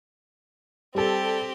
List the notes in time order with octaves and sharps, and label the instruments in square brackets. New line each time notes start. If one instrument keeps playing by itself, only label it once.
[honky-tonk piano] G3 A4 [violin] C4 G4